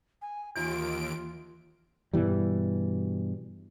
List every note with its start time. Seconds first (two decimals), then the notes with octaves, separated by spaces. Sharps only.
0.22 G#5
0.56 D#2 E3 F4 D7
2.13 G2 B2 E3 G3